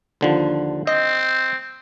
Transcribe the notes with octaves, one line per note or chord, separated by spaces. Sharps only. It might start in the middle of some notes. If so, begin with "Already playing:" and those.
D#2 D3 F3
C4 D#5